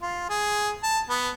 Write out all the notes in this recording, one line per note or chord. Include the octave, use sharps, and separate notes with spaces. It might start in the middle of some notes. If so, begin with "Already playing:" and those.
F4
G#4
A5
B3